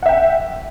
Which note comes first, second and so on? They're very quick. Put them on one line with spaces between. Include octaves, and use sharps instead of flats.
F#5 E5 G5